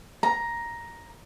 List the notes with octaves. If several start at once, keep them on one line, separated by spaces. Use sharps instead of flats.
A#5